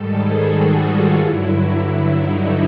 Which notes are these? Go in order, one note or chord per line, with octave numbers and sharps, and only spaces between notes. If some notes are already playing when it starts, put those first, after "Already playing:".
Already playing: G#2 D#3 G3 A4
G#4
F#4
F4
G2 D3 F#3 E4
E4
E4
D#4